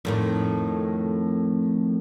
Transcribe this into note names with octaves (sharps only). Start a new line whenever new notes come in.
F2 A2 D#3